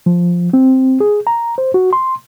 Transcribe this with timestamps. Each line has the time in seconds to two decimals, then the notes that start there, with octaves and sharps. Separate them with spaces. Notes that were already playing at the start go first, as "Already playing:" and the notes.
0.06 F3
0.53 C4
1.00 G#4
1.27 A#5
1.58 C5
1.74 F#4
1.93 C6